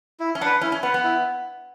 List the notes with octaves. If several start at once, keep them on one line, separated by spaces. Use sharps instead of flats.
E4
C#4
D4 F#5
B4
C#4 E4
C#4
B3 B4 F#5
B3
E4